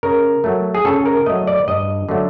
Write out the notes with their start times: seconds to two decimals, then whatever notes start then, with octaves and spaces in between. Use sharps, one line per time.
0.03 C#3 A#4
0.44 F#3 A3
0.75 G#4
0.85 C#3 A4
1.06 A#4
1.26 F#3 A3 D#5
1.47 D5
1.68 G2 D#5
2.09 D3 F#3 A3